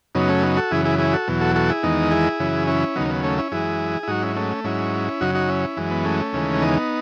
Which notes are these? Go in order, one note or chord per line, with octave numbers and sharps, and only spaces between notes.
F#2 C#3 F#3 B3 D#4
A3 C#4
B3 D#4
F#4 A4
F#2 C#3 E3 E4 G#4
E4 G#4
E4 G#4
F#4 A4
E2 B2 F#3
F#4 A4
F#4 A4
E4 G#4
E2 D#3 G#3 B3 D#4
E4 G#4
F#2 C#3 E3
C#4 E4
D#2 C#3 F#3 B3 D#4
B3
A3 C#4
C#4 E4
F#2 E3 G#3 E4 G#4
E4
G#2 F#3 D#4 F#4
C#4 E4
A3 C#4
G#2 F#3 C#4 E4
F#2 C#3 F#3 D#4 F#4
D#4 F#4
C#4 E4
F#2 E3 G#3
B3
A3 C#4
D#2 C#3 E3 G#3
B3 D#4